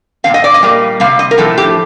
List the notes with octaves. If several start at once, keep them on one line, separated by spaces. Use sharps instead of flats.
A#2 F3 C4 F5
D#5
D5
D#5
A#2 G3 A#3
C3 G3 C4 F5
D#5
A#4
A2 F3 A3 C4 A4
G4